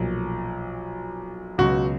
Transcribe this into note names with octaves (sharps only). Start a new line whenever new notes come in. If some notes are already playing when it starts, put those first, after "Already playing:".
Already playing: B1 A#2 F3
C#2 B2 F#3 F#4